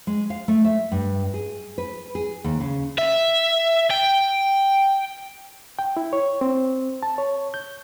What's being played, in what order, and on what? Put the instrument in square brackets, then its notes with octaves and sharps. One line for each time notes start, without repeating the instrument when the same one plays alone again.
[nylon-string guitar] G#3
F5
A3
E5
G2
G#4
B4
G#4
D#2
C#3
[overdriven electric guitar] E5
G5
[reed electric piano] G5
E4
C#5
C4
A5
C#5
G6